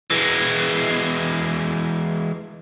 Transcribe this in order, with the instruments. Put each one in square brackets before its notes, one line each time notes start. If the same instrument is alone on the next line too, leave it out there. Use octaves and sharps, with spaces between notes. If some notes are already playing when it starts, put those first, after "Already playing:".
[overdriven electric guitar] E3 G#3